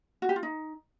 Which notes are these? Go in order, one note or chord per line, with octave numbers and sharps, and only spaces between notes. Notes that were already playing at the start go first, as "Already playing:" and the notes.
F#4
G4
F4
D#4